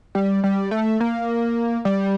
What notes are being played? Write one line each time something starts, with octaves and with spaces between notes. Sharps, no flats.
G3
G3
A3
A#3
G3